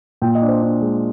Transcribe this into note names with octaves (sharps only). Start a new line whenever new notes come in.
A#2 G5
D#5
D4
C5
D4
G#3